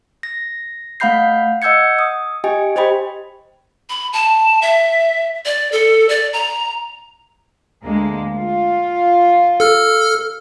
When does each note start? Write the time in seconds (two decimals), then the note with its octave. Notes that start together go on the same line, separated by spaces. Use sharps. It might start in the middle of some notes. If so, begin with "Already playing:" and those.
0.23 A#6
1.00 A3 F5 F#5 B5 G6 C7
1.62 D#5 F#5 E6 G6 G#6 C#7
1.99 D#6
2.44 G4 D#5 G5 G#5
2.76 G4 C5 D#5 G5 B5
3.90 B5
4.13 A5
4.62 E5
5.45 D5
5.72 A4
6.09 D5
6.33 A#5
7.84 D2 G#3 A#3
8.37 F4
9.60 A4 F6